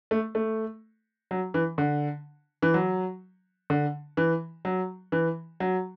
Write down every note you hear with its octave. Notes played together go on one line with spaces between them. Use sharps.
A3
A3
F#3
E3
D3
E3
F#3
D3
E3
F#3
E3
F#3